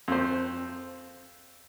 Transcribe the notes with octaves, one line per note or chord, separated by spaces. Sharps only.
F2 C5